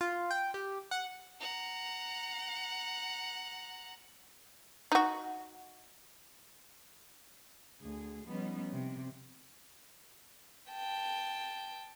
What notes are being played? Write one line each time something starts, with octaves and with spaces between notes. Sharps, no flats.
F4
G5
G4
F#5
F#5 A#5
D#4 F#4
D2 G#4
F3 G3 B3 C#4 D#4
C3
G5 A5